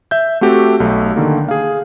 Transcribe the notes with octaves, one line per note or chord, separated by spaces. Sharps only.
E5 G6
A3 C4 F#4 G4 A4
B1 A3
D3 D#3 A#3
G#4 F5